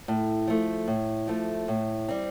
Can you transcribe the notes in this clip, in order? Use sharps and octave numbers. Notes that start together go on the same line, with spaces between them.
A2
F3 A3
A2
F3 A3
A2
G3 C4